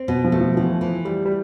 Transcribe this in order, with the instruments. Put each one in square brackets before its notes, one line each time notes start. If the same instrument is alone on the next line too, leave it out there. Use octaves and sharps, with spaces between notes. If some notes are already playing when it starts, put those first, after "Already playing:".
Already playing: [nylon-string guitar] C4
B2
[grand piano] F3
[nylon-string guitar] A3
[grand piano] F3
[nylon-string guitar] E3 [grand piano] F3
[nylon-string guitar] E3
[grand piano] G3 [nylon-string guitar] A3
[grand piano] G3